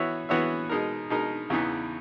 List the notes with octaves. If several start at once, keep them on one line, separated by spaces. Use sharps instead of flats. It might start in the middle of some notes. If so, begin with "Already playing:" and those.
Already playing: E3 B3 F#4 C#5 E5
E3 B3 F#4 C#5 E5
B2 G#3 D#4 A#4
B2 G#3 D#4 A#4
E2 C#3 E3 B3 D#4